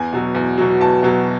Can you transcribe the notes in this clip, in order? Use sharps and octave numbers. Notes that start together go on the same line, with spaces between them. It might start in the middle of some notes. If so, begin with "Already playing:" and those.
Already playing: E2 G#5
B2 F#3
E2
B2 F#3
E2 A5
B2 F#3